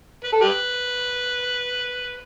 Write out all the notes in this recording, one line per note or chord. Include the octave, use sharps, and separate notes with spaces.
B4
A4
G4 B4